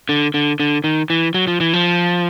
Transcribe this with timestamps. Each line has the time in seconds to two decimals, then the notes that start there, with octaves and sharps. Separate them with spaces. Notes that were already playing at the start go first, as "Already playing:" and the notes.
0.09 D3
0.34 D3
0.60 D3
0.84 D#3
1.10 E3
1.34 F#3
1.47 F3
1.60 E3
1.74 F3